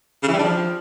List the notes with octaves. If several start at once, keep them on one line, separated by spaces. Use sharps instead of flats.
C#3
E3
G3
D4
F3